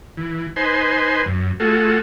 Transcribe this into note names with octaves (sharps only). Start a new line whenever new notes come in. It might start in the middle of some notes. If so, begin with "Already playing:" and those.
E3
D#4 B4 C5 G#5 C6
F#2
A3 F4 F#4 G#4 A4